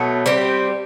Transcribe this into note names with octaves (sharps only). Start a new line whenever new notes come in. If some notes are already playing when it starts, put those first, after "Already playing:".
Already playing: B2 F#3 A3
G3 C4 G4